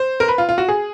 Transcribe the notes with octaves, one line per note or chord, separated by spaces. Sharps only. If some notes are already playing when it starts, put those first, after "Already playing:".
Already playing: C5
A#4
B4
F4
F4
F#4
G#4